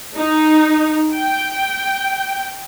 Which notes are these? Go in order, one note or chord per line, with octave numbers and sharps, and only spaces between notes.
D#4
G5